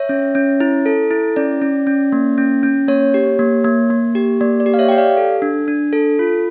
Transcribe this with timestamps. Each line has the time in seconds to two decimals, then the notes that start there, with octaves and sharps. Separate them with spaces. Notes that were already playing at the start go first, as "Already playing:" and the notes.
Already playing: C#5 E5
0.09 C#4
0.35 C#4
0.60 E4
0.86 A4
1.10 E4
1.36 C#4 D5
1.62 C#4
1.87 C#4
2.12 A#3
2.38 C#4
2.63 C#4
2.88 A#3 C#5
3.14 G4
3.39 A#3
3.64 A#3
3.90 A#3
4.15 G4
4.41 A#3 D5
4.60 D5
4.66 G4
4.74 F5
4.79 C#5 E5
4.89 G4 G5
4.98 D5 F5
5.17 A4
5.42 D4
5.68 D4
5.93 A4
6.19 F4